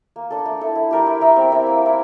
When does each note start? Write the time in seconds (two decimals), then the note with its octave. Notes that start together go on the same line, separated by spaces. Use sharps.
0.16 A#3
0.30 D4 A4
0.45 A3
0.61 E4 A4
0.76 E4
0.91 G4 A#4 D5
1.06 E4
1.21 A#4 E5
1.36 C4
1.52 E4 A#4 E5
1.66 A#3
1.81 E4 A#4